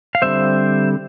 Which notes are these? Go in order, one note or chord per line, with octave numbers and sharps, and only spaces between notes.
F5
D3 G3 C4 C5 E5